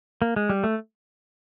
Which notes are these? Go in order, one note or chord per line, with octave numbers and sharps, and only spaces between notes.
A#3
G#3
G3
A3